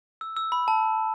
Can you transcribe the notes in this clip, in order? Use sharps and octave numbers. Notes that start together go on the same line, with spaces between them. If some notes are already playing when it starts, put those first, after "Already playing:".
E6
E6
B5
A5